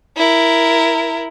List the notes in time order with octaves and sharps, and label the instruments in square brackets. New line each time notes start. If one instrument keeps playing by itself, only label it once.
[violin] E4 A#4